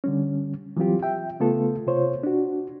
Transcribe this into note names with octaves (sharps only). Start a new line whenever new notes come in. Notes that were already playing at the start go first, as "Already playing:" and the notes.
D3 G3 C#4
E3 F#3 G3 C4 F4 G4
E5 G5
C#3 A3 B3 F4 A4
C3 F4 C5 C#5
D4 F#4